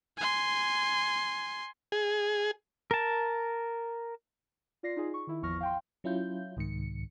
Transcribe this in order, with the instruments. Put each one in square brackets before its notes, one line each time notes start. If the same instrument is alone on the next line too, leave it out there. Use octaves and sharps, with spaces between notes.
[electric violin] G#5 C6
[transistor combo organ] G#4
[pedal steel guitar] A#4 A5
[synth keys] F4 D5 A#6 C7
D#4 F4 G#4
C#6
D#3 E4 E5
G#1 E2 F3 C#6 F6 A#6
F5 G5 C6
[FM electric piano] F#3 C#4 E4 F4 G6
C2 G#2 D#3 C#7